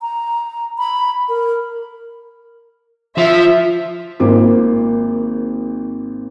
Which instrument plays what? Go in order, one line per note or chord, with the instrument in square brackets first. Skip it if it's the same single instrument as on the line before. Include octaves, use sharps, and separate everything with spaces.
[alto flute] A#5
B5
A#4
[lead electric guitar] F3 [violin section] E5
[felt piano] G#1 A#3 F4 C5 D6